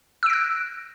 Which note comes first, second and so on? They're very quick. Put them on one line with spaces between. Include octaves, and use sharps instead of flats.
E6 D7 A#6 F#6